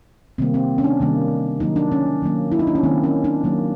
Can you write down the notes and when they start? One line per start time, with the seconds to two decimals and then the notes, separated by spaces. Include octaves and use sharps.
0.38 C3 D#3 G3 A#3 C4
0.54 C4
0.78 C#4
0.84 D4
1.00 C3 D#3 G3 A#3
1.60 D#3 F#3 A#3 D#4
1.76 D4
1.92 C#4
2.22 D#3 F#3 A#3
2.52 E4
2.59 D#4
2.67 D4
2.75 C#4
2.83 D#3 F#3 A#3 C4
3.04 C#4
3.24 D4
3.44 D#3 F#3 A#3